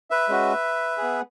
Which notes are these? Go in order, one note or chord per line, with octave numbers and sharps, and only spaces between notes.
B4 E5
G#3 C#4 F#4
B3 G#4